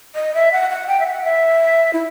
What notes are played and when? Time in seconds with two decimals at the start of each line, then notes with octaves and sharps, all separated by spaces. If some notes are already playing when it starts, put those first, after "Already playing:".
0.15 D#5
0.34 E5
0.52 F#5
0.70 F#5
0.88 G5
1.00 E5
1.07 F#5
1.24 E5
1.93 E4